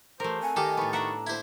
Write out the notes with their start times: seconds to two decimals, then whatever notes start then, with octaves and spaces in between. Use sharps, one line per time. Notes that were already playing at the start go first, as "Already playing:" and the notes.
0.20 E3 A3 G4 A#4 C5
0.42 C4 F#5 G#5
0.56 D#3 G4 A4 D#5
0.77 A2 B3 D#4 A5 C#6
0.93 D4 E5 F#5 A#5
1.27 A#3 E4 G4 C5